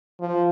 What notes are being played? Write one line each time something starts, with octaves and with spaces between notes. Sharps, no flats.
F3